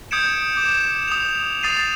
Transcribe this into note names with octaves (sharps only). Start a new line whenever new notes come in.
D#6 G6 G#6 C#7 D7 E7
D6 E7
D#6 F7
D#6 A6 C7 D#7 F7